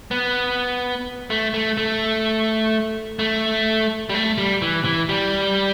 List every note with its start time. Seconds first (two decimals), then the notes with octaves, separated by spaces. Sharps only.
0.11 B3
1.30 A3
1.54 A3
1.77 A3
3.19 A3
4.10 G3
4.14 A3
4.38 G3
4.62 E3
4.85 E3
5.09 G3